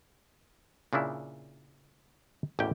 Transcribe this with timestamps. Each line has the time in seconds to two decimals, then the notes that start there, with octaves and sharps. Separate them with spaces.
0.93 A#2 C#3 D4 E4
2.59 A1 E2 B2 A#3 G4 G5